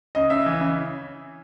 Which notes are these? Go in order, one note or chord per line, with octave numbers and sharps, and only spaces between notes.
C#3 D#5
C#3 E5
E3
C#3